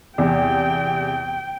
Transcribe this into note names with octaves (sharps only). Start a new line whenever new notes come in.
E2 C3 G5